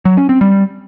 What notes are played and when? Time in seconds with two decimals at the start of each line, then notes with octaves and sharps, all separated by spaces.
0.05 F#3
0.17 C#4
0.29 C4
0.41 G3